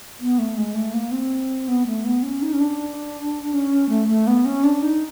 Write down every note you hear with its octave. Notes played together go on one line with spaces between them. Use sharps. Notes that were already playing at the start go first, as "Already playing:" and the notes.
B3
A3
G#3
A3
A#3
C4
B3
A3
B3
C#4
D#4
C#4
D4
C#4
A3
A3
B3
C#4
D4
D#4